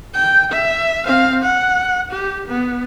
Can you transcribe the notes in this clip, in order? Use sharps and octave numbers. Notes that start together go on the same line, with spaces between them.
G5
E5
C4 F5
F#5
G4
B3